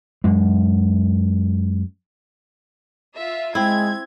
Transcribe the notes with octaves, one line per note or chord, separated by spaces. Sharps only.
F#2 G#3
F4 E5
G#3 C4 E4 G#6